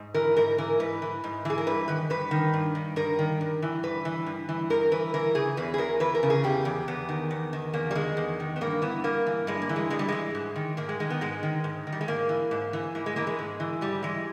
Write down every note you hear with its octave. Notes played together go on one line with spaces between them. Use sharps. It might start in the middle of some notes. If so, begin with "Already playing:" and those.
Already playing: G#2
E3 A#4
G#2 A#4
E3 A#4
G#2 B4
E3
G#2
E3 G#4
A#4
G2 B4
D#3 B4
G2 B4
D#3
G2
D#3
G2 A#4
D#3
G2
E3
G2 B4
E3
G2
E3
G2 A#4
E3 B4
E3 A#4
C#3 G#4
E2 B4
G#4
E2 A#4
E3 B4
A#4
C#3
G#4
E2 G4
E2
E2 B3
D#3
E2
D#3
E2 A#3
G3
D#3 G#3
E2
D#3
B3
G2 A#3
E3 B3
G2 A#3
E3
G2 G#3
A#3
E3
G#3
G2 G#3
G3
E3 G#3
G#2
D#3
G#2 A#3
G#3
D#3 G#3
B3
G#2 G#3
D#3
G#2
D#3
G3
G#3
G#2 A#3
E3
G#2
E3
G#2 A#3
G#3
E3 A#3
G#3
G#2
E3
G#2 G3
E3 G#3